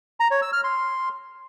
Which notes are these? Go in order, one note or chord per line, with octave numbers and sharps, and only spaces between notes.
A#5
C#5
E6
F6
C6